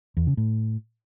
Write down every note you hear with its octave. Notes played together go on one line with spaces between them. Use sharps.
E2
C#3
A2